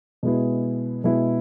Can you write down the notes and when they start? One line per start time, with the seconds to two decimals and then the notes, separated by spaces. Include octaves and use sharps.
0.23 B2 G#3 B3 E4 G#4
1.04 B2 G#3 B3 E4 G#4